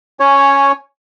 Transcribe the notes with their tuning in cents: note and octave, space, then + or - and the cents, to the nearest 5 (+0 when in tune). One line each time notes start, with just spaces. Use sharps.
C#4 +5 C#5 +0 G#5 -10